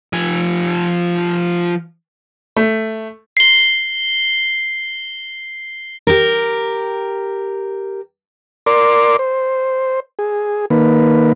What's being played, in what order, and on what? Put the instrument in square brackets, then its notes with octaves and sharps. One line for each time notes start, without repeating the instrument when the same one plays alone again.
[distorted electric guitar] F3 G#5
[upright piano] A3
[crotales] C7 G7
[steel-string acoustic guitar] G4 A#4
[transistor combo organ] A#4 D5 C6 D6
C5
G#4
D#3 A#3 B4